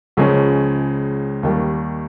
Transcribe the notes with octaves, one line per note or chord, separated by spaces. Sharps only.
C#2 C#3 F3 G#3 C#4
D#2 D#3 G3